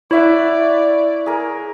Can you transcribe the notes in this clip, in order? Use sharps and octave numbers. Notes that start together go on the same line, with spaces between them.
E4 C#5 D5 E5 F#5
G#4 A#4